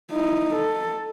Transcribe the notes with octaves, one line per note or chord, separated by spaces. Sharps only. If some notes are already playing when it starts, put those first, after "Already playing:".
D#4 E4
A4